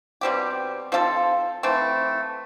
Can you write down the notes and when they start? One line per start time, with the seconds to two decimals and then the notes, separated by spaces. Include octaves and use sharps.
0.21 B2 G3 C4 G4
0.92 F3 C4 F4 A4
1.63 E3 A3 C4